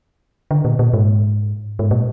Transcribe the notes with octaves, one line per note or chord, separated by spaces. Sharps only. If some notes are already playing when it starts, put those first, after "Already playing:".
D3
A#2
A#2
G#2
G#2
A#2